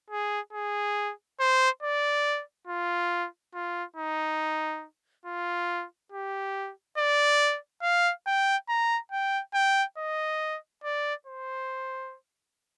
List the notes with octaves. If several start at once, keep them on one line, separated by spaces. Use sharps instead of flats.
G#4
G#4
C5
D5
F4
F4
D#4
F4
G4
D5
F5
G5
A#5
G5
G5
D#5
D5
C5